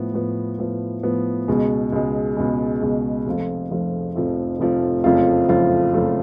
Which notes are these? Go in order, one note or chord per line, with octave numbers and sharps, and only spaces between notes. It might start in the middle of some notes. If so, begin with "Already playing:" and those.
Already playing: A2 F3 B3
A2 F3 B3
A2 F3 B3
A2 F3 B3
C#2 B2 G#3
C#2 B2 G#3
C#2 B2 G#3
C#2 B2 G#3
F1 F2 F3 A3 F4
F1 F2 F3 A3 F4
F1 F2 F3 A3 F4
F1 F2 F3 A3 F4
F#1 F2 F3 A3 F4
F#1 F2 F3 A3 F4
F#1 F2 F3 A3 F4